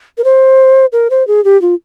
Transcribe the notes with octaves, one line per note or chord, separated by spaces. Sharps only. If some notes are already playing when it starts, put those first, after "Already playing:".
A#4
C5
A#4
C5
G#4
G4
F4